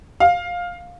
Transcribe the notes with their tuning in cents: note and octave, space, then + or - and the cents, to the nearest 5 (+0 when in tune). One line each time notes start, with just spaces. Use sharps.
F5 +10